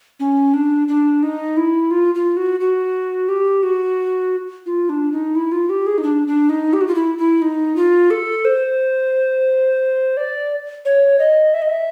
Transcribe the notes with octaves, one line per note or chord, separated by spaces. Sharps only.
C#4
D4
D4
D#4
E4
F4
F4
F#4
F#4
G4
F#4
F4
D4
D#4
E4
F4
G4
G#4
D#4
D4
D4
D#4
G4
F#4
F4
E4
E4
D#4
F4
A4
C5
D5
C#5
D#5
E5
D#5
E5